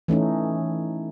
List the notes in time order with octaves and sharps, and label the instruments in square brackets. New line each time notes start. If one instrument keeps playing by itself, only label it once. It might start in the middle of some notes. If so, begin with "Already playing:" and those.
[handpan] E3 A3 C#4 D#4